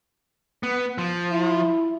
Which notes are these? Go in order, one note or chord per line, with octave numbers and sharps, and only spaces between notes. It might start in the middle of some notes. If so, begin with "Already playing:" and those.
B3
F3
E4